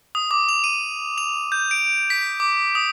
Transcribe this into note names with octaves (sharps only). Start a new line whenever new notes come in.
D#6
D6
F7
D#7
F7
G6
D7
B6
D6
D#6